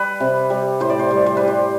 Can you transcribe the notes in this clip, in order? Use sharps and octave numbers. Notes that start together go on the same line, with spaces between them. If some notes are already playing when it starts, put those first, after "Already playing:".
Already playing: G3 B4
C3
G3
A2 C5
D5
C5
G3
C5
G3 B4
C5